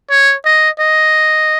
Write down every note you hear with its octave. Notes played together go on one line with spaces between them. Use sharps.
C#5
D#5
D#5